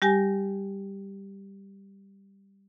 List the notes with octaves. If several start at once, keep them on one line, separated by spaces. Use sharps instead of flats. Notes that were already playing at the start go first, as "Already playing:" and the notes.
G3 G4 G#5 A#6